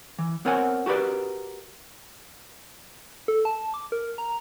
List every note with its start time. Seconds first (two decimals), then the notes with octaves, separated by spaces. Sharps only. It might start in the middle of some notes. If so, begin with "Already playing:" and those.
0.19 E3
0.45 B3 C4 A#4 C#5 F#5 G#5
0.86 F#4 G4 A#4 B4 D5
3.28 A4
3.45 A5
3.74 D6
3.92 A#4
4.18 A#5